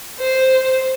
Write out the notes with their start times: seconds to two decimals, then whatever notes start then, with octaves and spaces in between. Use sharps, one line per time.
0.20 C5